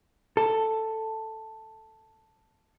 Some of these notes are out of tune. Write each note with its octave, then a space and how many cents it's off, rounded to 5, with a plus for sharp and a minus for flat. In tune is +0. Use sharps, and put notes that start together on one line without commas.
A4 +5